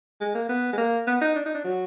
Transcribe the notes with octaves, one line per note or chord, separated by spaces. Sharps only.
G#3
A#3
B3
G#3
A#3
B3
D#4
D4
D#4
D4
F#3